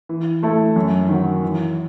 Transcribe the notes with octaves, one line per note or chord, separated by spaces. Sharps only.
E3
A3 E4 A4
F#2
D#3 F#3
E3